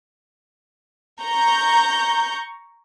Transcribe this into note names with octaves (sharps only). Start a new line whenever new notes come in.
A#5 C#6 G6